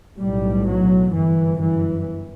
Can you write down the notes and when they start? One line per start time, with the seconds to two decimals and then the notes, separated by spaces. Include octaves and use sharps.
0.18 B1 A2 G3
0.66 F#3
1.13 G1 F#2 E3
1.60 E3